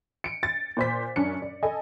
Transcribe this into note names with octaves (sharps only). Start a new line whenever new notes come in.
C#7 D7
A6
A#2 C5 B6
F#2 C#4 D4 C#7
D5
A4 D#5 G#5